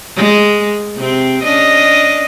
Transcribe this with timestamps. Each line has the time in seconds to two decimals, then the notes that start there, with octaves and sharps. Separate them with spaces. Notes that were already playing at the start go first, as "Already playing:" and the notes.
0.16 G#3
0.97 C3 C4
1.43 C#4 D4 D#5